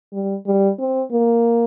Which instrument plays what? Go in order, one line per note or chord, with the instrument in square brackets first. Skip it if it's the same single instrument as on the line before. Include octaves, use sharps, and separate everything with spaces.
[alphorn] G3
G3
C4
A#3